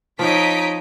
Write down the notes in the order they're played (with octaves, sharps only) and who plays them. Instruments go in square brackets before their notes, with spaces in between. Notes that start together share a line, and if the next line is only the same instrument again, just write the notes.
[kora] F3 C4 [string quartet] D#4 C#5 D#5 [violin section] B6 D7